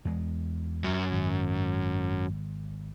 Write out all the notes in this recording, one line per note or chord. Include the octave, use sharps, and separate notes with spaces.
E2 G#3
F#2
G#1